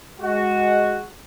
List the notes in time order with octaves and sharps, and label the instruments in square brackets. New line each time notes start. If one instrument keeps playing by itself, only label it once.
[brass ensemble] G#3 F#4